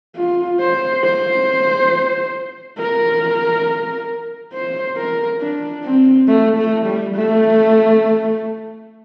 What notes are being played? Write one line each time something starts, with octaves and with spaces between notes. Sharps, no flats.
F4
C5
C5
A#4
C5
A#4
D4
C4
A3
A3
G3
A3